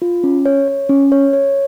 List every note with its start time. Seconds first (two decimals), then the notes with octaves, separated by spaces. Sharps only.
0.02 F4
0.24 C#4
0.46 C#5
0.68 C#5
0.89 C#4
1.12 C#5
1.33 C#5